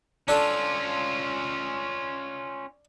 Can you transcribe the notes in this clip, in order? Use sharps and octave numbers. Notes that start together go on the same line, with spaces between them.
C#4 D4 F4 A4